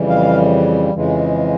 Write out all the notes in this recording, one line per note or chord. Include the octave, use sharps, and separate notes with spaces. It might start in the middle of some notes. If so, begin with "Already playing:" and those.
Already playing: F2 C#3 E3 G3
F5
F2 C#3 E3 G#3